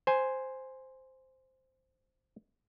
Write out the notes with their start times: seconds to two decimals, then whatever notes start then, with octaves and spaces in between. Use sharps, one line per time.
0.07 C5 G#5